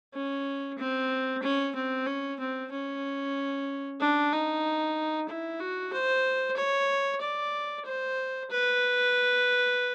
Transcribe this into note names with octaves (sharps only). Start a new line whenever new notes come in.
C#4
C4
C#4
C4
C#4
C4
C#4
D4
D#4
E4
F#4
C5
C#5
D5
C5
B4